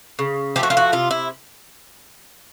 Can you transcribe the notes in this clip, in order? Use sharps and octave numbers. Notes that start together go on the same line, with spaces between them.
C#3
F3 A3 G4
F#4
F4
F#4
C3 F4
E4